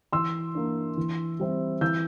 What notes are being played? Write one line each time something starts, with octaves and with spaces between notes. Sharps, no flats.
E3 C6 E6
A#3 D4
E3
G3 C4 E4
E3 E6 G6